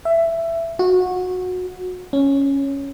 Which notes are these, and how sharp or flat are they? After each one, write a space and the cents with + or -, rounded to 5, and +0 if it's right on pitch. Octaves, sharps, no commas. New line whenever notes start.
E5 +15
F#4 -20
C#4 +0